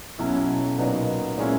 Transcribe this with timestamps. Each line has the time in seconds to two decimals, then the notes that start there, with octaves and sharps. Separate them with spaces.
0.19 B1 B2 F#3 C#4 E4
0.78 A#2 F#3 B3 D#4
1.38 A#2 G#3 C#4 E4